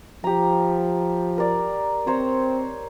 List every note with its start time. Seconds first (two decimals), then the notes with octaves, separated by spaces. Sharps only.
0.24 F3 G4 A#5
1.38 A#4 D5
2.07 C4 C5 C#5 A#5